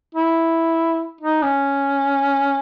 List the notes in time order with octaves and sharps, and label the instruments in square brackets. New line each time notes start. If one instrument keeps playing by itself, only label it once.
[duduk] E4
D#4
C#4